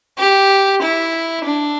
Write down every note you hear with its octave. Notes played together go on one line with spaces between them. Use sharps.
G4
E4
D4